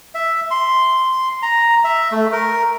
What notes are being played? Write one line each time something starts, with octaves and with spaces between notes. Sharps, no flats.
E5
C6
A#5
E5
A3
A#4